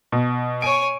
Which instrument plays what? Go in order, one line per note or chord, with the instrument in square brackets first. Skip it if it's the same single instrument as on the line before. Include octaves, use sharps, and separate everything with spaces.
[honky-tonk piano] B2
[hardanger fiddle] C#5 G#5 [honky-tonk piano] D7